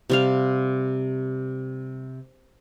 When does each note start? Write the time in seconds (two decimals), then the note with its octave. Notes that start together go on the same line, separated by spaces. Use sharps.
0.10 C3 G3 F5